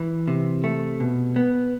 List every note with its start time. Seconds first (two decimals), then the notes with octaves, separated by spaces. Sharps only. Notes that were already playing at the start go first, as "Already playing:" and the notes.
Already playing: E3
0.28 C3
0.64 A3
1.00 B2
1.36 B3